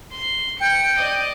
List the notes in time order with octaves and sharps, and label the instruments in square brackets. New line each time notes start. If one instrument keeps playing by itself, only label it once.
[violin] C6
[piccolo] G5 [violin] C#7
[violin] D5 D#5